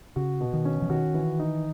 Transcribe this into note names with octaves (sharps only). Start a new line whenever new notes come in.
C#3 F#4
B2
D#3
C#4
E3
D#3 F#4
E3
D#4